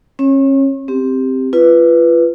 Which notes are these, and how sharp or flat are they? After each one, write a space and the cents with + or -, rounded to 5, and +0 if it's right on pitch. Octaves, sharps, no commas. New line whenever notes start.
C#4 -35 C#5 -15
C4 +0 G4 +5
F4 -25 B4 +0